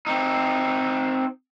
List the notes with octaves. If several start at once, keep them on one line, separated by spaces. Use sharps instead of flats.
C4 D#4